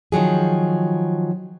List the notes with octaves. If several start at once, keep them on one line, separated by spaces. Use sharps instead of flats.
D#3 F3 F#3 G#4